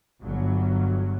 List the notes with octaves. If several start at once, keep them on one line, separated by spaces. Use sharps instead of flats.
G1 F#3